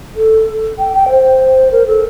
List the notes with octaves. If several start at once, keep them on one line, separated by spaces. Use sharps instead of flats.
A4
G5
G5
C5
A#4
A4